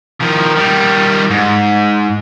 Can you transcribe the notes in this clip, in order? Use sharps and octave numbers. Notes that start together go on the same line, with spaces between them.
D#3 F3
D#3 G3
G#2